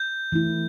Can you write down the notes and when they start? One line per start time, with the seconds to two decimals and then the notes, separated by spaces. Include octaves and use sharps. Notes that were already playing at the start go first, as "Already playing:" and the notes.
Already playing: G6
0.32 E3 A3 E4